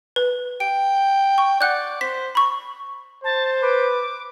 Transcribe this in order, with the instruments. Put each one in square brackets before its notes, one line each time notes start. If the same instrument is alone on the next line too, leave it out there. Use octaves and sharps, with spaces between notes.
[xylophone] B4
[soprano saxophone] G5 [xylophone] D7
[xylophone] C#6
[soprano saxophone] D5 [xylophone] F#5 F#6 G6
[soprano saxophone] C5 [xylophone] B6
[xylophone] B5 C#6
[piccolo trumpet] C5 [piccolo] A5
[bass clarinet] B4 [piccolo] D6